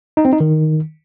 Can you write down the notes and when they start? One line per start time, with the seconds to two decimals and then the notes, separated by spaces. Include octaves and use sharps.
0.17 D#4
0.25 C4
0.33 D#4
0.40 D#3